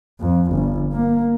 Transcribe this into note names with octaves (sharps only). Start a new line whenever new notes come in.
F2
G1
A#3